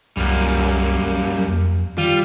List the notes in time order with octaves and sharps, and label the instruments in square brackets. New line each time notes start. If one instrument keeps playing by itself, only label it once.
[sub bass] C2 [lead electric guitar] F#2 [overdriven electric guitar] G3 A#3
[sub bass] F2
[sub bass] D#3 [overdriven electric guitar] G3 [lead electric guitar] F4